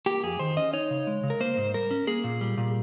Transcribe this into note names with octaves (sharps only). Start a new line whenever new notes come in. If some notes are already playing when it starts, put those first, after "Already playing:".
A#3 G4
F2 G#4
D#3 C5
C#4 D#5
D#4 C#5
C#3
G#3
C#3
A#4
A#3 C5
G#2
G3 A#4
C#4
A#3 G#4
A#2
G3
A#2